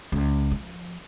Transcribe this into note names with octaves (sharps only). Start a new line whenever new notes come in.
C#2
F3